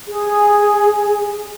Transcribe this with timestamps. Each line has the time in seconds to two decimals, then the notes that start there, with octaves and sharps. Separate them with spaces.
0.08 G#4